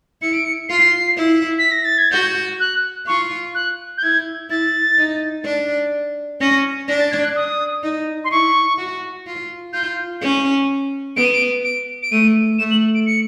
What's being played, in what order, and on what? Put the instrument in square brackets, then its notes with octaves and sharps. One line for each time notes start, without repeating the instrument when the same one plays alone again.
[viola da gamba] E4 [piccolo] C#7
[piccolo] D7
C#7
[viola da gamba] F4 [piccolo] C7
[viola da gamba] E4
[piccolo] B6
A#6
A6
G#6
[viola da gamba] F#4 [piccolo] G6
[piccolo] F#6
[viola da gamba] F4 [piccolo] C#6
[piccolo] F#6
G6
[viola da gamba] E4 [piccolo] G#6
[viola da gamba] E4 [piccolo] A6
[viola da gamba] D#4
D4
[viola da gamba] C#4 [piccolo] A#6
[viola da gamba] D4 [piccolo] A#6
[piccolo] A6
G#6
F#6
D#6
[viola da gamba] D#4
[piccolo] C6
[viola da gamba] E4 [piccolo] C#6
[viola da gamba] F#4
F4
[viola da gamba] F4 [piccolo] G6
[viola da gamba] C#4
[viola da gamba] B3 [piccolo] D7
[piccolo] D#7
D7
D7
D7
[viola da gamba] A3 [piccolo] D#7
[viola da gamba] A3 [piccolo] E7
[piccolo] F#7
D7
C#7